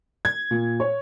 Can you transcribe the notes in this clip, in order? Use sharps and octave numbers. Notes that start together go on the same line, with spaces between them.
G#6
A#2
C#5